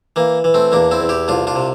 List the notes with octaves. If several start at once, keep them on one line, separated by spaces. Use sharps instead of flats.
E3 A#3
E3
A3 C4
E2 A#3 D4
C4 E4
E2
E4 G4
C2 D4 F4
D4 F4
C3